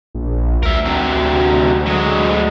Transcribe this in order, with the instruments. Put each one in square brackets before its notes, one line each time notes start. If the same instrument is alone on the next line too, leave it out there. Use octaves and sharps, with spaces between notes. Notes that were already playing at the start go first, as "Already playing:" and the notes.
[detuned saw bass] A#1
[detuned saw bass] D2 [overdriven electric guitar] A#4 E5
[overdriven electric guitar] C3 F#3
F#3 G#3